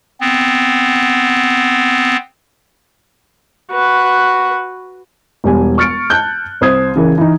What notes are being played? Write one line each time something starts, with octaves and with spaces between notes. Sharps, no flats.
B3 C4
F#4 B4
E1 G3 G#5
C#6 F6 A6 C#7 D7
A5 F#6 G6
C2 C5 D#6 G#6
C#3 E3 A#4
E3 D#4